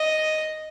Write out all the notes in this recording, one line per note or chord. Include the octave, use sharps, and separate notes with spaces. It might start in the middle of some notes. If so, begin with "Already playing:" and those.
Already playing: D#5